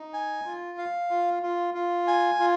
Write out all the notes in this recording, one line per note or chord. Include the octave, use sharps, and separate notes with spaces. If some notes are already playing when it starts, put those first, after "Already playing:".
Already playing: D#4
G#5
F4
F5
F4
F4
F4
G#5
F4